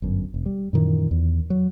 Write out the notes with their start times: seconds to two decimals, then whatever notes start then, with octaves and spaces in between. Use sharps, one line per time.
0.02 G1 F#2
0.34 E1
0.46 G3
0.73 F#2 A#2 D#3 E3
1.11 E2
1.50 F#3